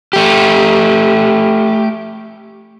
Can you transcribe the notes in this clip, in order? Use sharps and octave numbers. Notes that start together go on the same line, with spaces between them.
A3 G4